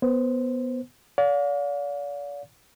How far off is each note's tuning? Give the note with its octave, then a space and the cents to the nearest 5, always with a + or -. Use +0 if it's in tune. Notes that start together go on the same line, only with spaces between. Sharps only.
B3 +0 C5 +0
D5 -40 F5 +40